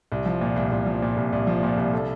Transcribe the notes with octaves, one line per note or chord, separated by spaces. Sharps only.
C2
F3
A#2
C2
C2
F3
A#2
C2
C2
F3
A#2
C2
A4